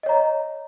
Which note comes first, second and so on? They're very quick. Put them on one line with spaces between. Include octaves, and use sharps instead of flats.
D#5 C#5 A#5